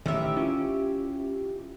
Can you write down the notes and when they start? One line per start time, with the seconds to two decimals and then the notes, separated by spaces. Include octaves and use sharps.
0.06 A1 D#3 G4 E5
0.36 C#4 E4 F4